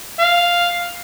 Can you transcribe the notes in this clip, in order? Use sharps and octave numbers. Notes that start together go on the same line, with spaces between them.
F5